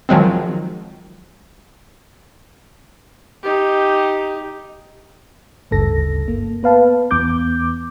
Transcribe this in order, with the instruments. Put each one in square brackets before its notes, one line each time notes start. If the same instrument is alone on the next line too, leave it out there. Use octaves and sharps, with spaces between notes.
[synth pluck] D#3 F3 F#3 G#3 C4
[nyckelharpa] D#4 G4
[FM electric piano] G1 D2 G2 C#3 A4 A#6
A#3
B3 B4 F5 A5
E2 E3 B3 D6 G6